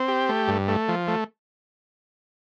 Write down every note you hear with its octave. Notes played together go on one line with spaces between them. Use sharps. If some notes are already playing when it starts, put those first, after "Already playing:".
Already playing: C4
G4
A3
G2
A3
F3
A3